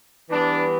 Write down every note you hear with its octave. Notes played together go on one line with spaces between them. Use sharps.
E3 G3 B3 D4